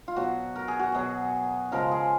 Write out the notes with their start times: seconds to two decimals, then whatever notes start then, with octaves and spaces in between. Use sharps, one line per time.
0.08 F4
0.16 B2 F#3 F#4
0.56 A#4
0.68 G#4
0.79 F#4
0.92 B2 F#3 G#4
1.72 C#3 F3 G#3 A#4
1.91 G#4